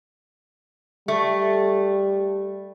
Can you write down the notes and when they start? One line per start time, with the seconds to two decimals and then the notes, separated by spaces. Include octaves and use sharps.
1.08 G3 A3